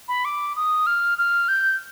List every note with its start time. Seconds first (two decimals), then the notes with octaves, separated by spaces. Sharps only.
0.08 B5
0.25 D6
0.56 D#6
0.86 F6
1.18 F6
1.48 G6